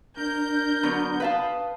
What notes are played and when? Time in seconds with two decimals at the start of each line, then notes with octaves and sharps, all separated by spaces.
0.17 D4 A#4 G6
0.83 D3 F#3 B3
1.20 B4 F5 A5 D#6